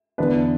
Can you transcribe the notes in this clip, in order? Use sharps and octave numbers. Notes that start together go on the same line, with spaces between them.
E2 D3 B3 D4 B4